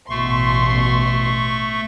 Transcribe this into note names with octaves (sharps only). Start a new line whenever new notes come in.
A1 B2 A3 C6 C#6